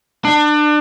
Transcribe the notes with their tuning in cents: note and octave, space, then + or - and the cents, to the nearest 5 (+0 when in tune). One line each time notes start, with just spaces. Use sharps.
D4 +30